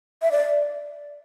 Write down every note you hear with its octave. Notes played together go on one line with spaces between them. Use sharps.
E5
D5